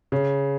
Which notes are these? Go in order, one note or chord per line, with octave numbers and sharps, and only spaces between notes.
C#3